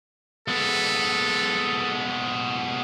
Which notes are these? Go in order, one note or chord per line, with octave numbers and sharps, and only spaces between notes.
G#3 B3 A4